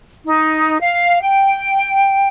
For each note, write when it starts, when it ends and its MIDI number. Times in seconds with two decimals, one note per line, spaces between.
0.25 0.80 63
0.80 1.21 77
1.21 2.28 79